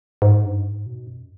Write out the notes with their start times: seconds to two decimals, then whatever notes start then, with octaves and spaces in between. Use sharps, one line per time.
0.22 G#2
0.44 G2
0.64 G#2
0.86 B2
1.07 F#2